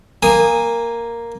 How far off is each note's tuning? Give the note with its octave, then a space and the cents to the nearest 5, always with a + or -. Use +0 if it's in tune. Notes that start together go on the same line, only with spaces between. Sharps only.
A#3 +0 G#5 -20 D#6 +0